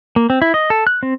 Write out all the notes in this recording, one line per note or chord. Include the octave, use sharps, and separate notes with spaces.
A#3
C4
E4
D#5
A4
F#6
C4